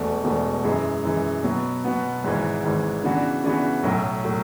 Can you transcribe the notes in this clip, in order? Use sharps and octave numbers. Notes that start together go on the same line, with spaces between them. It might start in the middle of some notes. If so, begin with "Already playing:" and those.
Already playing: E1 E2 B2 A3
E1 E2 B2 A3
F#2 E3 G#3
F#2 E3 G#3
B2 F#3 B3
B2 F#3 B3
G#1 G#2 E3
G#1 G#2 E3
C#3 E3 B3 D4 F#4
C#3 E3 B3 D4 F#4
B1 A2 F#3
A2 F#3